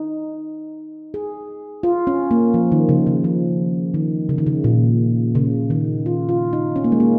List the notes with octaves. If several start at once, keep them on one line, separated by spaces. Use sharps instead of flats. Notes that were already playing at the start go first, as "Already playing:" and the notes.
Already playing: D#4
G#4
F4
C#4
A#3
F3
D#3
C#3
C#3
F3
D#3
C#3
D#3
C#3
A#2
C#3
D#3
F4
F4
D#4
C#4
A#3
G#3
A#3